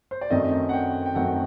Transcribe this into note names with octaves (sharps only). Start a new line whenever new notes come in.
C5
D5
F#2 D#3 F#3 A3 C4 D#5
F#5
G5
G5
F#2 D#3 F#3 A3 C4 F#5